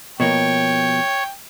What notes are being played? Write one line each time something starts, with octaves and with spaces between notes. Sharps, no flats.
B2 F3 A#3 C#5 G5